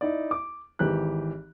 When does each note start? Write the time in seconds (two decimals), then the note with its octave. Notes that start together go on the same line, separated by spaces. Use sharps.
0.01 D#4 E4 D5
0.31 D6
0.79 G#1 E3 G4 F#6